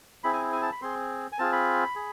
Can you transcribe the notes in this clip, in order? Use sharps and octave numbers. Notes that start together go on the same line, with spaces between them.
C4 E4 G#4 B5
G#5
G#5
A5
B5
C4 G#4 C6
G#5
C4 F4 G#4 A5
B5
G#4